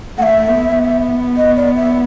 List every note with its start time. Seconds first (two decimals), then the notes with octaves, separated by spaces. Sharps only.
0.18 A3 E5 F#5
0.48 B3
0.77 B3
1.37 D#5
1.56 D5
1.76 E5